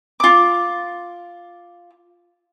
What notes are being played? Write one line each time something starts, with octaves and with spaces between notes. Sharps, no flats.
F4 D6